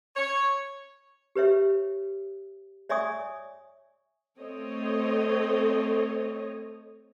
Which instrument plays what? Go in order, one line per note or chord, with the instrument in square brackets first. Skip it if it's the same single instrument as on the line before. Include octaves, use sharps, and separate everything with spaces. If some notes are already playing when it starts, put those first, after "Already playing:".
[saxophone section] C#5
[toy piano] G4 B4 C#5 E5
C#5 D5 E5 G#5 C#6 D#6
[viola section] A3 C4 A4 C#5 D#5